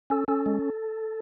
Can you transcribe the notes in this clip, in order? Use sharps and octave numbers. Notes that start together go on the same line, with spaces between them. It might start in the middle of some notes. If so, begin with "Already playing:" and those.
C#4 A4
C#4 A4
G#3